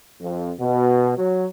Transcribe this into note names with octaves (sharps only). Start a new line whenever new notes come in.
F2
B2
F#3